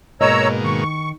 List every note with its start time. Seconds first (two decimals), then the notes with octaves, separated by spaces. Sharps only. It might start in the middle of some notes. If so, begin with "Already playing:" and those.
0.21 G#2 B2 A#3 A#4 C#5 D#5 A#5 E6
0.64 D#3 C#6